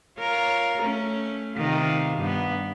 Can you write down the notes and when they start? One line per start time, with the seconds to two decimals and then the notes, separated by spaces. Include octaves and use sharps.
0.19 F4 A#4 C#5
0.80 A3 C#4
1.56 C3 D#3 F4
2.16 G2 B3